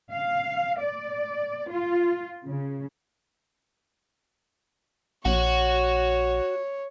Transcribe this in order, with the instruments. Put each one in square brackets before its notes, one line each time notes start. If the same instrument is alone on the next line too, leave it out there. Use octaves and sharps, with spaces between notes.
[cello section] F5
D5
F4
C#3
[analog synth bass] A#1 [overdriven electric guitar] F#4 F#5 [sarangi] C#5